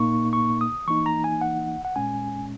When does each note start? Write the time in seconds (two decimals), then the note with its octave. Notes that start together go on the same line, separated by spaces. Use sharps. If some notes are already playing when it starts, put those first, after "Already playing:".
Already playing: A#2 A#3 D#4 C#6
0.33 C#6
0.61 D#6
0.88 E3 A#3 D#4 C#6
1.06 A#5
1.24 G#5
1.41 F#5
1.85 F#5
1.96 A#2 G#3 C#4 G#5